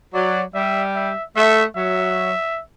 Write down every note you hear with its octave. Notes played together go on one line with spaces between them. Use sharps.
F#3 D5
G3 E5
E5
A3 E5
F#3 E5